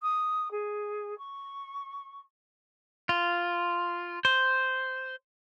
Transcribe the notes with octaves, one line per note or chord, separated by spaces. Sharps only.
D#6
G#4
C#6
F4
C5